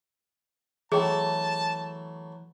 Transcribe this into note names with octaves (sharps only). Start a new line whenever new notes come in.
E3 F#3 A3 G#4 G5 A5